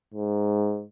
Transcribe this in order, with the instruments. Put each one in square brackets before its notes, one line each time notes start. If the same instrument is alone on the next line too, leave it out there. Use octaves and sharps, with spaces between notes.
[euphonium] G#2